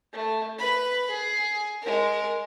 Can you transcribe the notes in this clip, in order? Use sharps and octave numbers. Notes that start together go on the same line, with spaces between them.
A3
B4 B5
G#4
G#3 A#4